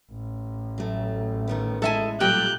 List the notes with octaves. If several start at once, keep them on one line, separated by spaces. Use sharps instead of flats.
A1
F#3 A3
D#3 A3 B3
G#3 E4 A4 D#5 E5 G#5
A#2 F#3 G3 A3 G4 F#6 G6